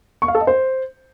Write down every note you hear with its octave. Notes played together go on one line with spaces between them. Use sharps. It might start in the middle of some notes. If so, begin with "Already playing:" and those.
C#6
F5
A4
D#5
C5